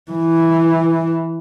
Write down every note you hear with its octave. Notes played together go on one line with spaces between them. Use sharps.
E3